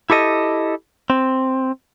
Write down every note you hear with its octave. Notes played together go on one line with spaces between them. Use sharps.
E4 G4 A4 D#5
C4